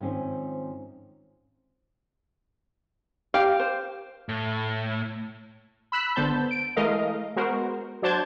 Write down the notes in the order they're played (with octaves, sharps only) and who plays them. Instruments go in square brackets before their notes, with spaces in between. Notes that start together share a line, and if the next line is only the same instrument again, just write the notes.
[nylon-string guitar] G#2 D#3 F3 C4 C#4
[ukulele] G4 [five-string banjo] F5
[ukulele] C5
[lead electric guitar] A2
[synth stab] B5 E6 F#6 B6
G#1 D3 B3 C5 A5 G6
D7
E3 G#3 A3 A#4 D#5 F5
G#3 B3 F#4 A#4 C5
F#3 D4 C5 A5 G6 G#6